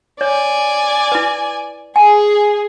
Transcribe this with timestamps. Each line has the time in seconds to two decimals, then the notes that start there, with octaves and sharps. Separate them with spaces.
0.21 C#5 D5 G#5
1.12 E4 B4
1.96 G#4 G#5